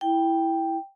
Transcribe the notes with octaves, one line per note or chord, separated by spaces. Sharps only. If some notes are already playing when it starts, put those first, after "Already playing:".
E4 G5